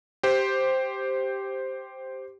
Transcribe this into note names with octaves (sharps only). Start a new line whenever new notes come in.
G4 C5